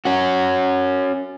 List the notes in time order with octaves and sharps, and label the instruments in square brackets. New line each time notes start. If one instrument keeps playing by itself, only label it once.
[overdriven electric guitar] C#4 F#4